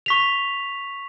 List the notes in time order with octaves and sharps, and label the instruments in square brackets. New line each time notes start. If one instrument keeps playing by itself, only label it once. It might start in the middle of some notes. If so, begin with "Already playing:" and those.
[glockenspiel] C#6 B6 F7